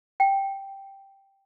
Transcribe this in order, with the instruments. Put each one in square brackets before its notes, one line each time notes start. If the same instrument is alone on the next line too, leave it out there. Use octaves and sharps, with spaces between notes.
[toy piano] G5